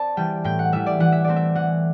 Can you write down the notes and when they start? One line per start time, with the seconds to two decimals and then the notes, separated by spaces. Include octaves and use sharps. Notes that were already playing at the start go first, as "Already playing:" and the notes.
Already playing: C4 C5 D5 A5
0.17 E3 G3 G5
0.44 A2 G5
0.59 F#5
0.72 E3 G3 E5
0.86 D5
1.00 E3 F#5
1.12 E5
1.24 A3 C4 D5
1.36 E5
1.55 E3 F#5